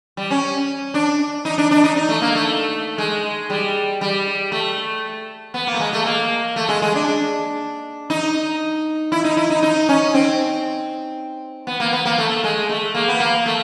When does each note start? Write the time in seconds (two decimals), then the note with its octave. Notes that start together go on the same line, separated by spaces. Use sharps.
0.17 G3
0.31 C#4
0.94 D4
1.45 D#4
1.58 D4
1.71 D4
1.84 D#4
1.96 D#4
2.09 A3
2.22 A#3
2.35 A3
2.98 G#3
3.50 G3
4.01 G3
4.52 A3
5.54 B3
5.67 A#3
5.74 A3
5.80 G#3
5.93 A3
6.05 A#3
6.56 A3
6.69 G#3
6.82 G#3
6.95 D4
8.10 D#4
9.12 E4
9.24 D#4
9.37 E4
9.50 D#4
9.63 D#4
9.89 C#4
10.14 C4
11.67 B3
11.80 A#3
11.93 B3
12.05 A#3
12.18 A3
12.44 G#3
12.69 A3
12.95 A#3
13.08 B3
13.20 A#3
13.46 A3